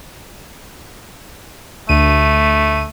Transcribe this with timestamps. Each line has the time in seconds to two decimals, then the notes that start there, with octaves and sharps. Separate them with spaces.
1.89 D2 A3 D#7